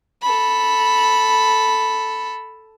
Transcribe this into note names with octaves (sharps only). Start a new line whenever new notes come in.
A4 B5